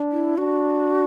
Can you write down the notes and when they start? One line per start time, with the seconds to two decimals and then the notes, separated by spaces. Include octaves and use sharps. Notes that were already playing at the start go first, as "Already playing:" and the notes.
Already playing: D4
0.12 E4
0.38 D4 F#4